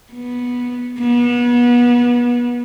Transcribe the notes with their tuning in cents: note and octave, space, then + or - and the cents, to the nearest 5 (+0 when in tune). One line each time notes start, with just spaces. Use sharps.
B3 -10
B3 -30